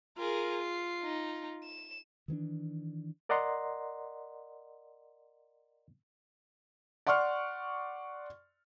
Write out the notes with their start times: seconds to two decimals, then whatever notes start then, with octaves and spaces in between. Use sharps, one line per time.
0.18 F4 G#4 A#4
0.63 C7
1.03 D#4
1.64 E7
2.28 D#3 E3 B3 D4
3.29 A#4 D5 D#5 F#5 A#5 C6
7.07 D5 F#5 C6 C#6 F6